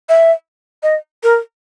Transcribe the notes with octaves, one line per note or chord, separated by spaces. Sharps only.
E5
D#5
A#4